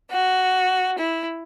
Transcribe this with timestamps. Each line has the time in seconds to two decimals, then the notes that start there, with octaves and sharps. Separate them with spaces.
0.11 F#4
0.97 E4